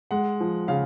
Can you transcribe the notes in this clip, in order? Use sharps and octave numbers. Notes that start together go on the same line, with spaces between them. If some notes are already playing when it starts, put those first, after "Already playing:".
G#3 F#5
F3
C#3 F5